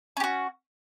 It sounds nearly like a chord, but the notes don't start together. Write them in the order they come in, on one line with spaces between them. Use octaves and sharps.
C#4 G4 F#4